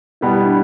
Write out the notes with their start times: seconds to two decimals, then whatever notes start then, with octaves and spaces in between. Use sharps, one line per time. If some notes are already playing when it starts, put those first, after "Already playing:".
0.21 B2 G3 B3 E4
0.44 D4